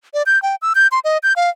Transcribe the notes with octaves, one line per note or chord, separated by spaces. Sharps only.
D5
G6
G5
E6
G6
C6
D#5
G6
F5